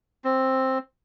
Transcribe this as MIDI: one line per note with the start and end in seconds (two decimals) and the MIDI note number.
0.24 0.78 60